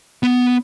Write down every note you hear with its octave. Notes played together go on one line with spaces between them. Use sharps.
B3